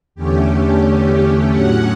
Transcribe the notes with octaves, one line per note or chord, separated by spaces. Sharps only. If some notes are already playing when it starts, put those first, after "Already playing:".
E2 D3 A3 C#4 G4
A2 F#3 C#4 F#5